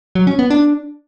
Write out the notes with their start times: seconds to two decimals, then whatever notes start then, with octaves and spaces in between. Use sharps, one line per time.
0.15 F#3
0.27 C#4
0.39 B3
0.50 D4